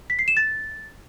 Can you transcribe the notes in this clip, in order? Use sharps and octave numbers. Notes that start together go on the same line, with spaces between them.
B6
C7
E7
A6